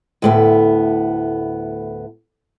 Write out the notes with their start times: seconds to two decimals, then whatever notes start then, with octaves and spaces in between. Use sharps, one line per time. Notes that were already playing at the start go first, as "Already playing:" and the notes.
0.22 D2 A2 B3